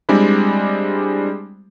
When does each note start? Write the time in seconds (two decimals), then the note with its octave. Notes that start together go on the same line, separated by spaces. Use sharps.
0.09 G3 G#3 C4 D4 E4